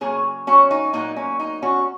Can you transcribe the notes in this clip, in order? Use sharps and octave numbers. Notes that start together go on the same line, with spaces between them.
C#3 F#3 A#3 G#4 C#5
C#4 F#4
D#4
A#2 F#3 A#3 D#4
C#4
D#4
C#4 F#4